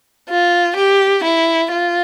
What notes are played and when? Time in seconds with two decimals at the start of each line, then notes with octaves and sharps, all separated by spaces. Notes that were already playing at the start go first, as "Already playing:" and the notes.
0.29 F4
0.77 G4
1.24 E4
1.72 F4